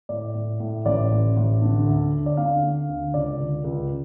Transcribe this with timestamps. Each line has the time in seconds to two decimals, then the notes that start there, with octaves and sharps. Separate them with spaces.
0.09 A2 D5
0.35 A2
0.60 A2
0.85 A1 D5
1.11 A1
1.36 A1
1.62 D3
1.86 D2
2.13 D2
2.26 D5
2.37 D3 F5
2.63 D3
2.89 D2
3.14 C#2 D5
3.40 C#2
3.64 C#2